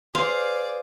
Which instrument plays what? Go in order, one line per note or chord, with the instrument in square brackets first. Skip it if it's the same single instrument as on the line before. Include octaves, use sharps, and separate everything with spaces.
[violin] G#4 D5 [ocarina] B4 [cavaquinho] C5 [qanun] F5